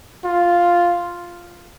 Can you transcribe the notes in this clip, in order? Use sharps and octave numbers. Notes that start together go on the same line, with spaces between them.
F4